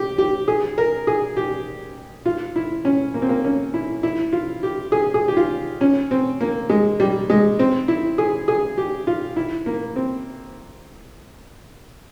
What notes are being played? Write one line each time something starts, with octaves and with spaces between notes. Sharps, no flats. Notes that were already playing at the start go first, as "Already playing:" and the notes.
Already playing: G4
G4
G#4
A#4
G#4
G4
F4
E4
C#4
A#3
C4
A#3
C#4
E4
E4
F4
G4
G#4
G#4
G4
F4
C#4
C4
A#3
G#3
G3
G#3
C4
E4
G#4
G#4
G4
F4
E4
A#3
C4